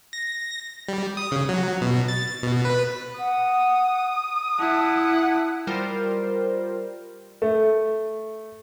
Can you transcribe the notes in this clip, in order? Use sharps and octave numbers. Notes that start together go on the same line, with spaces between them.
A#6
G3
D#6
C#3
F#3
B2
A6
B2
B4
F#5 D#6
E4 F#5 A5
G3 F4 A#4 C5
A3